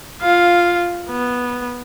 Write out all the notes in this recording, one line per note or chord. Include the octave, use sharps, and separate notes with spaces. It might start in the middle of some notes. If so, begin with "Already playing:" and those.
F4 F5
B3